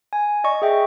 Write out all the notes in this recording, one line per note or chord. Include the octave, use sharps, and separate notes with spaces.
G#5
D5 D#5 C#6
G#4 E5 G5